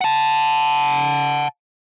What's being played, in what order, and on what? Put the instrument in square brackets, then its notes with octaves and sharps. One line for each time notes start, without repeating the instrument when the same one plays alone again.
[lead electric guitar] F#5 A5